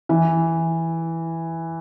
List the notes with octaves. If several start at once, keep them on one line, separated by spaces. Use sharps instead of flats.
E3